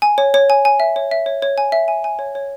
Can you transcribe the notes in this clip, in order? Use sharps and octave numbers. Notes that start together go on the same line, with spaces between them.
G#5
C#5
C#5
G#5
G#5
E5
C#5
E5
C#5
C#5
G#5
E5
G#5
G#5
C#5
C#5